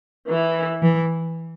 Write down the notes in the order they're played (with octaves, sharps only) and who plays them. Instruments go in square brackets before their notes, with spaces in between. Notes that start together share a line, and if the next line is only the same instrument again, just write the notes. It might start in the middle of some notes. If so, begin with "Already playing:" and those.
[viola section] E3
[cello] E3